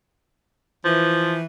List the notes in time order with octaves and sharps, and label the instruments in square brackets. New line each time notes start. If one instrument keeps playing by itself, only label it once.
[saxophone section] E3 [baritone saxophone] F3